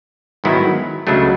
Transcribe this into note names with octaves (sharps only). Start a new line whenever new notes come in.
G#2 D#3 F#3 B3 E4
C#2 C#3 F#3 A3 D4